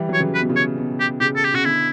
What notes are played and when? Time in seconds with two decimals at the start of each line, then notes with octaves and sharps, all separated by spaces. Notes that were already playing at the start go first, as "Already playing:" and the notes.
Already playing: E3 G3
0.09 F#3 C#5
0.20 C#3 E3
0.34 B4
0.40 B2
0.49 C#3
0.56 C#5
0.78 B2
1.00 G4
1.21 C#3 G4
1.36 A4
1.45 G4
1.54 C#3 F#4
1.64 B2 D3 E4